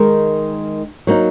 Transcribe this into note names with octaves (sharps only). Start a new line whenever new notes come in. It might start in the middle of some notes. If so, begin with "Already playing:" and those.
Already playing: D#3 G#3 D#4 A#4
F#3 A#3 D#4